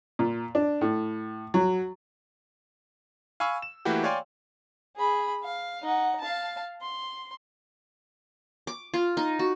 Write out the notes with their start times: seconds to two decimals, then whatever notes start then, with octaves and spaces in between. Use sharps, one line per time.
0.19 A#2
0.55 D4
0.81 A2
1.54 F#3
3.40 F5 G#5 B5 C#6 E6
3.62 E7
3.85 E3 A3 A#3 E4 F#4 G4
4.04 C#5 D5 F5 G5 G#5 C6
4.97 G#4 B5
5.44 F5
5.83 D#4 F#5
6.21 F5 A5
6.82 C6
8.67 D6
8.94 F4
9.17 D#4
9.39 F#4